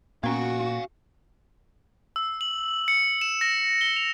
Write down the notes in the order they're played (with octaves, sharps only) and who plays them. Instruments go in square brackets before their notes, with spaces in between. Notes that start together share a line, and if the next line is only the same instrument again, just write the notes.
[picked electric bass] A#2 [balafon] B3 C#4 [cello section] F#4 [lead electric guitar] F5 G#5
[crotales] E6
F#7
C#7
E7
A#6
G7
F7